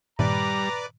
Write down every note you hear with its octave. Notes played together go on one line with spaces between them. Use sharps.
G2 A#2 D#3 G3 B4 D5 A#5 D6